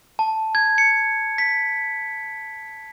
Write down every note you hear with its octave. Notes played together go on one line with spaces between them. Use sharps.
A5
G#6
C#7
B6